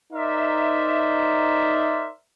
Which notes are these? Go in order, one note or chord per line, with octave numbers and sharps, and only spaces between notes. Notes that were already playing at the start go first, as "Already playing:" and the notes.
D#4 A#4 C5 D5 E5